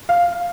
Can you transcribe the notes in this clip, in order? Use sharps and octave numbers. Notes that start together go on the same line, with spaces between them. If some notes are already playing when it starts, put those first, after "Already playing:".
F5